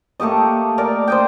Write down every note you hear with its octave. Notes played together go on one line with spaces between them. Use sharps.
A3 A#3 G4 D#5
A#4 D5 A#5
C5 D#5 G5